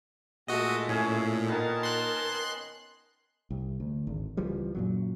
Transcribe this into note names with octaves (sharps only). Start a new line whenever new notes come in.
A#2 G#3 A3 F#4 D#5
A2 C#4 G#4 C#5
D#3 B3 D#4 A#4 A5
C6 F#6
C2
D2
G#1
C#2 E3 F3 G3
F#2 A#2 F#3